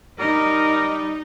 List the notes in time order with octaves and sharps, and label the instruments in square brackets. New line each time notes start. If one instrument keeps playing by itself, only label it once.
[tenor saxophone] G3 [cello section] D#4 [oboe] A#4